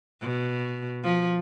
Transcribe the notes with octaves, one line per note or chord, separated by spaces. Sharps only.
B2
F3